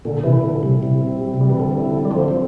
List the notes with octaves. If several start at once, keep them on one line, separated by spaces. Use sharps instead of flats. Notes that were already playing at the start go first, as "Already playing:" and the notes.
A#2 D3
C3 E3 E4
D3 E4
C3 G3
C3 E4
C4
G3
C3
G3
E3
D3 C4
E4
D3
E4
G3
D3 F3
C4
F3